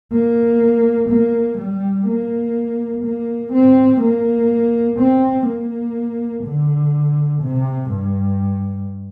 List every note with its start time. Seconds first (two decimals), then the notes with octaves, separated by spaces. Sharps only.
0.12 A#3
1.09 A#3
1.58 G3
2.07 A#3
3.04 A#3
3.52 C4
4.02 A#3
4.99 C4
5.47 A#3
6.44 D3
7.42 C3
7.90 G2